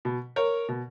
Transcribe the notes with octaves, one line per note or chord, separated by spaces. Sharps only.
B2
A#4 C#5
B2